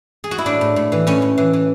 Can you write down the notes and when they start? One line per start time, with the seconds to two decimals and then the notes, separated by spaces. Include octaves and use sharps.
0.24 G#4
0.31 F#4
0.38 E4
0.46 A2 D4
0.61 A2
0.76 A2
0.92 E3
1.07 A2 C#4
1.22 A2
1.38 E3
1.53 E3